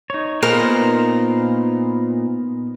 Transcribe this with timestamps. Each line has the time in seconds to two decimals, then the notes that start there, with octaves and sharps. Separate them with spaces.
0.10 D#4 C#5
0.43 A#2 B3 D#4 A#4 C5